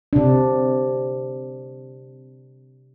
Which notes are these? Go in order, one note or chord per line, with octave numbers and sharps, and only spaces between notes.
C3 D4